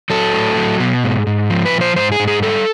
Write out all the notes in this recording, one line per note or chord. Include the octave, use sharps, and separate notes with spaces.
F#3 A4
A2
F#3
B2
G#2
G#2
F3
B4
A#2
C5
G#2 C5
G#4
G#2
G#4
G3 A4